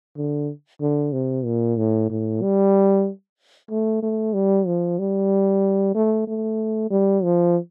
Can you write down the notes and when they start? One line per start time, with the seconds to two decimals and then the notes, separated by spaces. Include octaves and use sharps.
0.17 D3
0.81 D3
1.13 C3
1.45 A#2
1.77 A2
2.10 A2
2.42 G3
3.70 A3
4.02 A3
4.34 G3
4.67 F3
4.99 G3
5.95 A3
6.27 A3
6.91 G3
7.23 F3